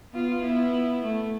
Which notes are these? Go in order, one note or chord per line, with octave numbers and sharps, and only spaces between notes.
B3 F4
B3 E4
A3